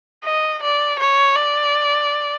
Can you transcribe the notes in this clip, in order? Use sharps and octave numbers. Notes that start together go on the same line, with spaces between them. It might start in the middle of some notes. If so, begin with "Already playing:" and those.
D#5
D5
C#5
D5